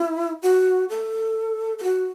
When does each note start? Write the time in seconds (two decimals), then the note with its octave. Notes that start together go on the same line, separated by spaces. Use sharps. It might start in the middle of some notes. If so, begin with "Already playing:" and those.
Already playing: E4
0.42 F#4
0.89 A4
1.79 A4
1.83 F#4